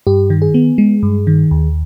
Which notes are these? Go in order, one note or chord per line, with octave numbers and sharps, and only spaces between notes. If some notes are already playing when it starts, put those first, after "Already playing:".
G2 G4
D#3
G#4
B3
G#3
G2
D#3
D#2